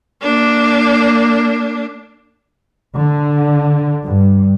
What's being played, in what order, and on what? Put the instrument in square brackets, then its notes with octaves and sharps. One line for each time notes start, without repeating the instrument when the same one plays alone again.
[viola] A#3 D4
[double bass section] D3
G2